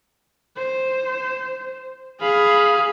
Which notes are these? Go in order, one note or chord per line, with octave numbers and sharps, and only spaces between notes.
C5
G#4 F5 B5